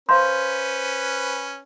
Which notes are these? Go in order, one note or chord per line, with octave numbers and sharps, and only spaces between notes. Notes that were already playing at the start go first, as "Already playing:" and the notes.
C#4 B4 C5 F5 A#5 C6 G6